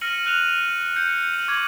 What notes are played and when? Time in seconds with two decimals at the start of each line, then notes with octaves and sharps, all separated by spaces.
0.01 F6 A#6 C#7 D#7 F#7
0.26 F6 F#6 D#7 F7
0.96 G6 C#7
1.33 D#7 F#7
1.48 C#6 D6 G#6 F#7